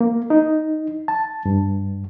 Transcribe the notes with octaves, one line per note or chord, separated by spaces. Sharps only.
A#3
D#4
A5
G2